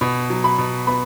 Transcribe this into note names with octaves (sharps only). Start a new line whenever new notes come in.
B2 B5
F#3
B5
B2
B3 B5